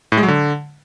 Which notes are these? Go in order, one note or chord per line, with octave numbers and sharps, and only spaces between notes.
A2
G#3
F#3
D3